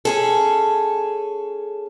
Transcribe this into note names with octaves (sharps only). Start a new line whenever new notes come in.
C#4 G#4 A4